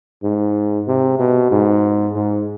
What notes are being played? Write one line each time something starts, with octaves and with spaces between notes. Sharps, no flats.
G#2
C3
B2
G#2
G#2